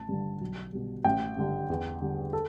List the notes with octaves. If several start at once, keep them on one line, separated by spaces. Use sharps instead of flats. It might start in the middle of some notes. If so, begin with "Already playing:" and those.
Already playing: A1 A5
G2 D3
B1
B2 G3
A1 G5
G2 D3 G3
E2
D3 G3
A4